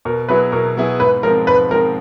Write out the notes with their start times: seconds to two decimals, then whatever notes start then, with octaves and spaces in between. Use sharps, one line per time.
0.05 B2 A#4
0.29 F#3 B3 E4 G#4 B4
0.52 B2 A#4
0.77 F#3 B3 E4 G#4
1.00 G#2 B4
1.23 F3 G#3 C4 A#4
1.47 G#2 B4
1.71 F3 G#3 C4 A#4